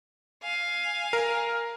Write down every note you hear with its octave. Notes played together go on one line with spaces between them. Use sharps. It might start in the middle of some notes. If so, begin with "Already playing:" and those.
F5 G#5
A#4